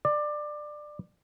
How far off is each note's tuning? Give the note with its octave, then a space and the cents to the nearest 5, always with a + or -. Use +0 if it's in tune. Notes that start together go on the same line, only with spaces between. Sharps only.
D5 +20